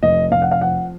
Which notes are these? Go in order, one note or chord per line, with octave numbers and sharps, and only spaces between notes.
F1 D#5
F1 F5
F#5
F5
F3 F#5